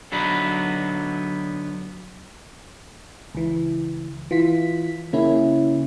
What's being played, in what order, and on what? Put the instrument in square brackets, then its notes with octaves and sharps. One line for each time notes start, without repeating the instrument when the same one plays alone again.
[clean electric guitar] D3 F#3 B3 D#4 B4
[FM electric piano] C#2 E3
E3 F4 B6
C#3 A#3 C#4 E4